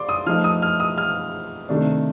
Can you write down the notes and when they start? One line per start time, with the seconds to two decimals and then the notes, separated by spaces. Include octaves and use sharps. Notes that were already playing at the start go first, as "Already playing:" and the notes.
Already playing: D5 C6 D6
0.09 D#6
0.26 F3 A3 D#4 F6
0.44 D#6
0.62 F6
0.80 D#6
0.98 F6
1.69 C3 D#3 A3 D4